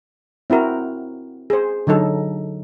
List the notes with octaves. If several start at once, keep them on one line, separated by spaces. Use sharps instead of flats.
C4 E4 F#4 A#4
G#4 C5
D3 F#3 D#4 A4